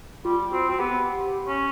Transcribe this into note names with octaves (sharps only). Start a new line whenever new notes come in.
G3 F4
C4 F#4
C4
B3 G4
C#4